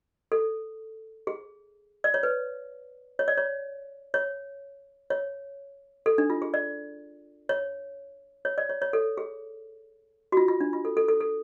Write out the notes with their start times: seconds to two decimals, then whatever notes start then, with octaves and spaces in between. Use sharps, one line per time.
0.32 A4
1.27 G#4
2.04 D5
2.14 C#5
2.23 B4
3.19 C#5
3.28 D5
3.37 C#5
4.14 C#5
5.10 C#5
6.06 A4
6.18 D4
6.30 F4
6.42 G#4
6.54 D5
7.49 C#5
8.45 C#5
8.58 D5
8.69 C#5
8.82 C#5
8.93 A4
9.17 G#4
10.32 F#4
10.37 F4
10.48 F4
10.60 D4
10.73 F4
10.85 A4
10.97 A4
11.08 A4
11.21 A4